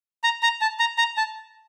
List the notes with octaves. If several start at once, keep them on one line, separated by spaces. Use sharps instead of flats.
A#5
A#5
A5
A#5
A#5
A5